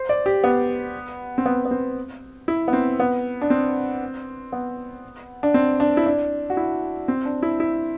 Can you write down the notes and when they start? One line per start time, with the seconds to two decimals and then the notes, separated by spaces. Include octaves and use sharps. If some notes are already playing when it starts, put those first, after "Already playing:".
Already playing: C5
0.09 D5
0.26 G4
0.44 B3
1.38 C4
1.46 B3
1.65 B3
1.71 C4
2.48 E4
2.68 B3
2.73 C4
3.00 B3
3.41 D4
3.50 C4
4.53 B3
5.43 D4
5.54 C4
5.80 D4
5.97 E4
6.06 D4
6.50 F#4
6.57 E4
7.08 C4
7.25 D4
7.43 E4
7.60 E4